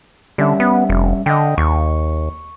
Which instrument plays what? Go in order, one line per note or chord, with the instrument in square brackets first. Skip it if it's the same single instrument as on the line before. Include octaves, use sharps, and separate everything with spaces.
[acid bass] D3 [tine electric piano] G3 C#4 E5
[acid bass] B3
F1
[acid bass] D3 [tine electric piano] D#5 G5
[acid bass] D#2 [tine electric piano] C#6